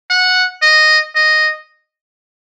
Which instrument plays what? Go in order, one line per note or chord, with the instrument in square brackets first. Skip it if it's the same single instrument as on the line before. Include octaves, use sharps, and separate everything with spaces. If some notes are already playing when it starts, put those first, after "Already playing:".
[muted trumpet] F#5
D#5
D#5